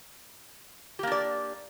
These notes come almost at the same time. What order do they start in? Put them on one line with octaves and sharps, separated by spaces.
G4 A#3 D4 D5